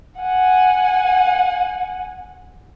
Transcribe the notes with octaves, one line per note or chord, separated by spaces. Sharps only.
F#5 G#5